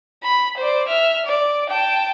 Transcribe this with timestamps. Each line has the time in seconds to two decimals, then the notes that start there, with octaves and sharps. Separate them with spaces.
0.23 B5
0.57 C5 D5
0.88 E5 F6
1.26 D5
1.70 G5 A5